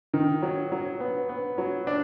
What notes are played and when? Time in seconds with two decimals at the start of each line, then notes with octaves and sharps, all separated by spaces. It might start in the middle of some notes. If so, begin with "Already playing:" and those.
0.14 D#3
0.42 F#3
0.72 F#3
1.00 B3
1.29 B3
1.58 F#3
1.87 D4